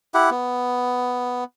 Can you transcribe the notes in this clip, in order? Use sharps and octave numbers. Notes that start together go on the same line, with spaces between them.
E4 G4 F#5
B3